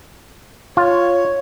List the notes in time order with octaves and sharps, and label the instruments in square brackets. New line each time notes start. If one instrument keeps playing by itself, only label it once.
[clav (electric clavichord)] F4 [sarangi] C#5